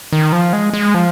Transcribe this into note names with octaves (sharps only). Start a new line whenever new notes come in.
D#3
F3
G#3
G#3
F3